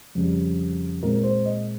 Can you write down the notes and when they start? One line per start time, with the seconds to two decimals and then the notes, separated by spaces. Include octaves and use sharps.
0.15 F2 C#3 G3
1.02 A#2 G#3 C4 A#4
1.14 A#4
1.23 C5
1.45 D#5